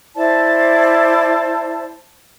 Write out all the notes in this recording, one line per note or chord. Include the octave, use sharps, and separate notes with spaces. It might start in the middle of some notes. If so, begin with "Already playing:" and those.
E4 C5 D5 A5